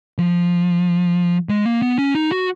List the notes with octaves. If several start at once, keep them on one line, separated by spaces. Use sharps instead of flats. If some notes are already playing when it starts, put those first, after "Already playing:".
F3
G#3
A#3
B3
C#4
D#4
F#4